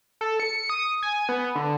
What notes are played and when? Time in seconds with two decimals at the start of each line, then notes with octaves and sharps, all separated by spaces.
0.21 A4
0.40 C#7
0.70 D#6
1.03 G#5
1.29 B3
1.56 D3